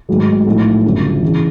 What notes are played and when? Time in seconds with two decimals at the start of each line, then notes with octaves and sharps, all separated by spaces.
0.09 G#1 G#2 D#3 F#3 A3
0.46 B1 A2 F3 A3
0.84 G1 F#2 C#3
1.22 C#3 E3